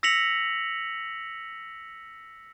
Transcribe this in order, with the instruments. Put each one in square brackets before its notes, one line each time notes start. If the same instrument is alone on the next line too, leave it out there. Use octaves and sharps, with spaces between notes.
[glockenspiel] E6 A#6 B6 C#7 F7 F#7